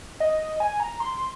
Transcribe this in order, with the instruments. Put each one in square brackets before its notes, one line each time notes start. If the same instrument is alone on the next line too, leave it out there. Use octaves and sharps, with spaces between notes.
[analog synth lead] D#5
G#5
A#5
C6